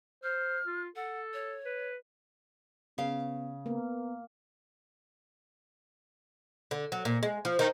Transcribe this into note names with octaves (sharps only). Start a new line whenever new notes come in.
C5 F6
F4
A4 F#5
C#5
B4
C#3 B3 F5
A#3 B3
D3
F#3
A#2
G#3
F3
D#3